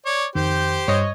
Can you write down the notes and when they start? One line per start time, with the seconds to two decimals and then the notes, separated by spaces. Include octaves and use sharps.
0.06 C#5 D5
0.35 F2 D#3 G4 C5
0.88 G2 C#5 D#5